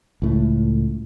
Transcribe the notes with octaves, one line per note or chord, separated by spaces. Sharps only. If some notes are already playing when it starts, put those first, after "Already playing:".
C#2 A2 A3